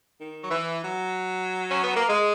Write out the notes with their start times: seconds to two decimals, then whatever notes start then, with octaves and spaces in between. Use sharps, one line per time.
0.18 D#3
0.41 F#3
0.50 E3
0.82 F#3
1.70 C#4
1.83 B3
1.95 A#3
2.09 G#3